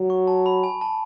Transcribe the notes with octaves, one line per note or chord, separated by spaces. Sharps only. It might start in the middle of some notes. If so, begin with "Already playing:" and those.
Already playing: F#3
C#6
A5
B5
G#5
A5